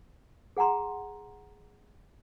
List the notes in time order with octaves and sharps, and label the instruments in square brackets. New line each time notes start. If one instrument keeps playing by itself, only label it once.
[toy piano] G#4 F#5 G#5 A#5 C6